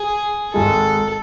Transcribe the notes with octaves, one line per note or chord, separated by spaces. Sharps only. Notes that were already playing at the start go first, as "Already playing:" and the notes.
Already playing: G#4
G#1 G#2 G#3 A4